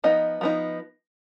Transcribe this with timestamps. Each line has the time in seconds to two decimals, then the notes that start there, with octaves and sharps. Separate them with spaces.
0.04 F3 B3 D#4 D#5
0.41 F3 B3 D#4